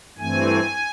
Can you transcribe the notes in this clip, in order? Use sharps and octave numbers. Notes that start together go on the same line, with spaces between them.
G2 E3 A3 C4 G#5